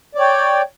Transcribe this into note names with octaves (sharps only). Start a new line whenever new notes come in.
C#5 D5 G5